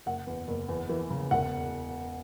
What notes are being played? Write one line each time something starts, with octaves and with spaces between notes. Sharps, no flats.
F#1 F#5
E2
F#1
E2
E3
C#3
E1 F#5